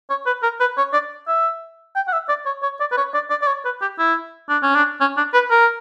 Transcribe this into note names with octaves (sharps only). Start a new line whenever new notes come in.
C#5
B4
A#4
B4
C#5
D5
E5
G5
F#5
E5
D5
C#5
C#5
D5
B4
C#5
D5
D5
D5
C#5
B4
G4
E4
D4
C#4
D4
C#4
D4
B4
A#4